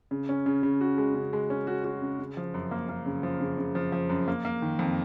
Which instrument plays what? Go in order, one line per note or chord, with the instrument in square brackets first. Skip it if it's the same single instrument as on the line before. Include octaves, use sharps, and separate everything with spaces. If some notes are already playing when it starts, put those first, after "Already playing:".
[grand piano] C#3
C#4
C#3
C#3
F#4
G#3
C#3
G#3
C#4
F#4
F#4
C#3
C#3
F3
F#2
A#3
A#3
C#3
F3
C#3
C#3
F3
F3
F#2
A#3
A#3
D#3
F2